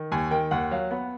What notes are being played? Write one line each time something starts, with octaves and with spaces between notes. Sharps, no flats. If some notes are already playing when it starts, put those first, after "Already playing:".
Already playing: D#3
D#2 G#5
D#3 G5
D#2 F#5
F#3 F5
B3 F#5